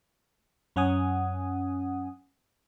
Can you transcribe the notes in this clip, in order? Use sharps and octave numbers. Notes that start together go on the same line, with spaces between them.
F#2 C#4 F#5 G#5 D#6